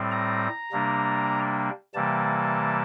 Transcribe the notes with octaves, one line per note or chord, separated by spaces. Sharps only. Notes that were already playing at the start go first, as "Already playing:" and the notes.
Already playing: A2 G3 C4
A#5
C3 G3 A#3 D4
C3 E3 G3 A#3 A5